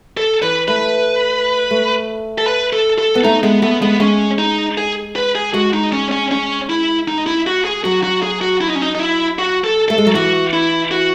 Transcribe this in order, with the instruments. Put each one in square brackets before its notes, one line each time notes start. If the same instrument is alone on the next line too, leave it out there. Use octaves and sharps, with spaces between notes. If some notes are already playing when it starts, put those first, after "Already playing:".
[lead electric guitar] A4
[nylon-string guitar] E3 [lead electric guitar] B4
[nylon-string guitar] A3 [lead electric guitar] B4
[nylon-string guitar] A3
[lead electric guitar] A4
B4
A4
A4
[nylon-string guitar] B3
[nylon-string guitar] A3 [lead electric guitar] D#4
[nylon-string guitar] G#3 [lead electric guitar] B3
[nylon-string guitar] A3 [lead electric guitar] B3
[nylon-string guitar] G#3 [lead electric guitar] B3
[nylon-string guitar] G#3 [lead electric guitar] C#4
[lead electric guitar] D#4
G#4
B4
G#4
[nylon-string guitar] G#3 [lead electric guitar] F#4
[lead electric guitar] D#4
C#4
C#4
C#4
E4
D#4
E4
F#4
G#4
[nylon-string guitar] F#3 [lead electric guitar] F#4
[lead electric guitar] F#4
G#4
F#4
E4
D#4
C#4
D#4
D#4
E4
F#4
A4
[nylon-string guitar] A3 [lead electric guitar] A4
[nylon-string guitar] G#3
F#3
[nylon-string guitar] E3 [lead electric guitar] F#4
[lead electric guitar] E4
F#4